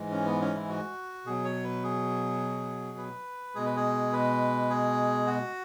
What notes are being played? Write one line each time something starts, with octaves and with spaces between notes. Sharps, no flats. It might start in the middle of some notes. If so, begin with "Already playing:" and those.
Already playing: G#2 E3 G#3
C#4
B3
C#4
E4
F#4
B2 F#3 G#4
C#5
B4
G#4
B4
B2 G#3 G#4
B4
G#4
B4
G#4
F#4